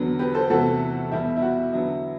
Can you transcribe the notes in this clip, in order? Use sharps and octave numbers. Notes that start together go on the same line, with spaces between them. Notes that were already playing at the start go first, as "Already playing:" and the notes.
Already playing: E2 D3 F#3 B3
G4 B4
A4 C5
E2 C3 E3 A3 F#4 A4
E2 B2 G3 E4 G4
E4
F#4
E2 D3 F#3 B3 E4